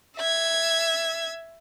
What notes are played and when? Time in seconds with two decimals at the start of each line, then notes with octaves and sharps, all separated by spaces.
0.17 E5 G#6